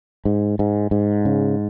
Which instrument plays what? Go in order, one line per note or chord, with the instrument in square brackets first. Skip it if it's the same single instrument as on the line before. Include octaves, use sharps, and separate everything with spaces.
[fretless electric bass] G#2
G#2
G#2
C#3